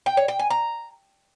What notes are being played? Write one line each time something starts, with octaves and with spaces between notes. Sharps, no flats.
G5
C#5
G5
G#5
A#5